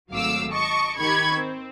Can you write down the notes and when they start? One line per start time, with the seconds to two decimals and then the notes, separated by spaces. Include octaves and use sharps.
0.11 G#1 F#3 A3 F5 D6 E6
0.50 D#5 A5 C#6 D6
0.97 D#3 G4 B5 C#6 G#6
1.32 C4